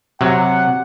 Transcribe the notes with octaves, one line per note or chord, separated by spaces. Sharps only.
C3 F#3 F#5